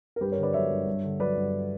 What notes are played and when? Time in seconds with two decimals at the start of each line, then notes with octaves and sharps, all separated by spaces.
0.16 A#4
0.21 G2 G4 B4
0.32 A#4 C#5
0.38 D3
0.43 B4 D5
0.53 F#3 C#5 E5
0.71 G2
0.87 G2
1.04 D3
1.19 F#3 B4 D5
1.37 G2